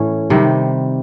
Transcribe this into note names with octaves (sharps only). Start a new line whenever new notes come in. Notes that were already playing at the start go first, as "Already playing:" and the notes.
Already playing: A2 E3 C#4
C3 D#3 G3